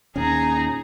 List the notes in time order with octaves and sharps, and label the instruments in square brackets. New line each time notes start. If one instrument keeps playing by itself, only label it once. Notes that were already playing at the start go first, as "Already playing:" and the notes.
[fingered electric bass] D#2 A#2 C#4 [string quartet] D#4 G#4 A#5